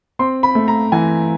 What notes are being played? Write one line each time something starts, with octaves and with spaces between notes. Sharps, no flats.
C4 C6
B5
A3
A#5
E3 G#5